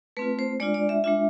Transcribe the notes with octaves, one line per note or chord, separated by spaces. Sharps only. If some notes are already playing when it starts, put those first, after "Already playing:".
A3 C4 F4 B4
C5
G#3 D4 F4 D5
D5
E5
G#3 D4 F4 E5